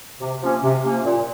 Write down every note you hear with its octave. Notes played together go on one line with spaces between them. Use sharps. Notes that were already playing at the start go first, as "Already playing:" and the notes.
C3
F3 A#3 C#4
C3
F3 A#3 C#4
A#2